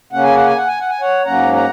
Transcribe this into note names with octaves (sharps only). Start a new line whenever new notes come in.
C#3 A#3 C#4 F#5
G#5
F#5
G#5
F#5
G#5
F#5
G#5
C#5 F#5
G#2 F#3 A#3 C#4 F#5 A#5
F#5 A#5